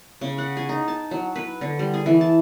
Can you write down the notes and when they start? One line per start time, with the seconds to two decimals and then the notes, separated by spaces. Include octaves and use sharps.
0.21 C#3
0.38 F#5
0.57 G#4
0.69 D#4
0.88 A5
1.11 F#3
1.36 B4
1.61 D3
1.79 G3
1.94 G#4
2.06 E3
2.21 A5